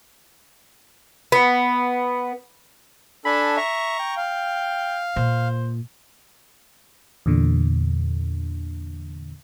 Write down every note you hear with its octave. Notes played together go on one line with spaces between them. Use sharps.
B3
D4 A4 G#5 B5
E5 A#5 C#6
G5
F5
A#2 C5
E2 A#2 D3